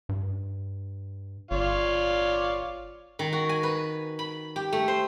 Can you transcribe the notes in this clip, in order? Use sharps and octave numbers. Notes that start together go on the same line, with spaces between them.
G2
G1 F4 C#5 D5
D#3
F#4
G#5
B4
B5
G4
A3
C5